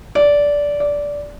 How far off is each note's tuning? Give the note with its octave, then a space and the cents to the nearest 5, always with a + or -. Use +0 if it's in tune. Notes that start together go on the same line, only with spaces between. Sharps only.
D5 -15
D5 -15